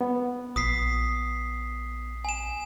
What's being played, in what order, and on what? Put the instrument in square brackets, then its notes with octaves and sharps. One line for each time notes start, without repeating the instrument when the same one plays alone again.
[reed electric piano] B3
[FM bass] A#1 [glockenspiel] D#6 B6 C7
[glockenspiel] G#5 E7